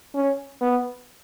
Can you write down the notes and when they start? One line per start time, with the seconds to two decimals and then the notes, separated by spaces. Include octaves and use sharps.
0.15 C#4
0.61 B3